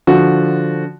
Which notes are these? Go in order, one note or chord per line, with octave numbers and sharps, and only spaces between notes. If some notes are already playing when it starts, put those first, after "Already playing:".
D3 F3 F#4